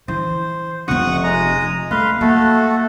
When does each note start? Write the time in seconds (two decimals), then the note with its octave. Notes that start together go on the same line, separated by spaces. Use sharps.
0.08 E3 C5
0.88 F1 C4 F#5 C#6 D#6
1.24 G#3 A#5 D#6
1.91 A3 B4 F5 C6
2.21 A3 A#3 F#4 A4